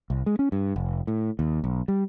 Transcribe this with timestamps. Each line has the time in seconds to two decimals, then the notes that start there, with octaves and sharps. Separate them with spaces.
0.10 C2
0.26 G#3
0.39 C#4
0.52 G2
0.76 F1
1.07 A2
1.39 D#2
1.64 B1
1.88 G3